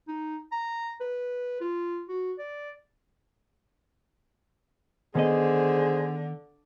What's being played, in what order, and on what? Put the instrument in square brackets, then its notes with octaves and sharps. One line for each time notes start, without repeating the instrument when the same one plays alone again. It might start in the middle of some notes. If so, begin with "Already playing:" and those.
[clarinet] D#4
A#5
B4
F4
F#4
D5
[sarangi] D3 [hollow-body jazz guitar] D#3 B3 D#5 [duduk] G#4 [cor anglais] C5